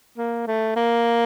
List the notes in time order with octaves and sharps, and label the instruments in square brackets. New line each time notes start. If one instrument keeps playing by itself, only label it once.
[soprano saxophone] A#3
A3
A#3